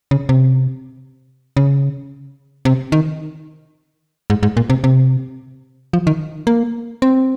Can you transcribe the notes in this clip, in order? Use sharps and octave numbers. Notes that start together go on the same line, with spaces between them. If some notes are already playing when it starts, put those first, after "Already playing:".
C#3
C3
C#3
C3
D#3
G#2
G#2
A#2
C3
C3
F3
D#3
A#3
C4